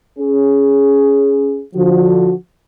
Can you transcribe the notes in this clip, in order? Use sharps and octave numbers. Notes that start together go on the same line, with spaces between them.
C#4 G#4
D3 F3 F#4